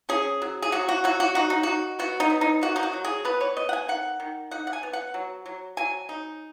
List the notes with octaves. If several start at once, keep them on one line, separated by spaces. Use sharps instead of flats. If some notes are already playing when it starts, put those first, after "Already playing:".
C#4 G#4
F#3
G#4
F#3 F#4
F#4
F#3 F#4
F#4
D#4 F#4
D#4
D#4 F#4
B3 F#4
D#4
B3
D#4
D#3 F#4
D#4
F#4
F#3
G#4
B3 B4
C#5
B3 D#5
F#5
G#5
D#3 F#5
D#3
D#4 F#5
F#5
G#5
B3
F#5
F#3
F#3
F#3 G#5
D#4